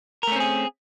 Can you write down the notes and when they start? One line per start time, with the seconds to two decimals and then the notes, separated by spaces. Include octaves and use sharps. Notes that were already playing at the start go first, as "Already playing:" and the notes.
0.23 A#4
0.27 A3
0.32 C#4
0.36 C4
0.40 G#4